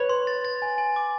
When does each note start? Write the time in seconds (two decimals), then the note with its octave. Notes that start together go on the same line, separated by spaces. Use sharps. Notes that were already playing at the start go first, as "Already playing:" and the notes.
Already playing: B4 C#5
0.09 C6
0.27 A6
0.45 A6
0.62 G#5
0.78 G#5
0.96 D6